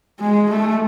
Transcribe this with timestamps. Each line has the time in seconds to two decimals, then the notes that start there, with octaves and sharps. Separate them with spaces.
0.20 G#3
0.49 A3